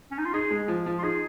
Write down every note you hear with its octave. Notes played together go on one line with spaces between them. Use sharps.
C#4
D#4
F4
D#4 G#4
G#3
F3
F3
F4
D#4 G#4